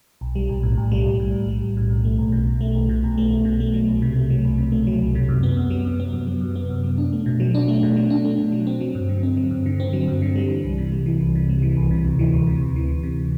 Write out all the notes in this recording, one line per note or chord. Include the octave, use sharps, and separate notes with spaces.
B1
G3
B1
A2
B1
G3
B1
A2
B1
G3
B1
A2
B1
A3
B1
B2
B1
A3
B1
B2
B1
A3
B1
B2
A3
F#3
C2
C3
A3
F#3
C2
C3
A3
F#3
C2
C3
F#2
B3
F#2
F#3
F#2
B3
F#2
F#3
F#2
B3
F#2
F#3
D4
A3
B2
F#3
D4
A3
B2
F#3
D4
A3
B2
F#3
C4
F#3
G2
D3
C4
F#3
G2
D3
C4
F#3
G2
D3
G3
E3
C2
C3
G3
E3
C2
C3
G3
E3
C2
C3
D2
E3
D2
C3
D2
E3
D2
C3